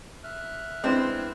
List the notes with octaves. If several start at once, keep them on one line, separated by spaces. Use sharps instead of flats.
E5 F6 F#6
G#3 B3 C4 D4 E4 C5